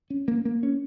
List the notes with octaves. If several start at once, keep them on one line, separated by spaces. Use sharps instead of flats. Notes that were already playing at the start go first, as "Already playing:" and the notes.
C#4
A#3
A#3
C#4